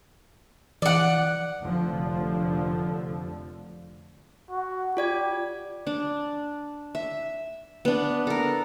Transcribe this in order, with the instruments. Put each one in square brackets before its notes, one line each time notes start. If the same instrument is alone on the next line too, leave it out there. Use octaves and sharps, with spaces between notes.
[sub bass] E3 [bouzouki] D5 F#5
[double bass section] F1 D3 F3
[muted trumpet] F#4
[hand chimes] F4 D5 G#6 [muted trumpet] G4
[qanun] D4
E5
B3 D4
A4 A#4